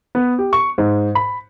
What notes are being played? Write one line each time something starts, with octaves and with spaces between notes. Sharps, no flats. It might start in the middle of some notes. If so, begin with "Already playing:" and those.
B3
G4
C#6
G#2
B5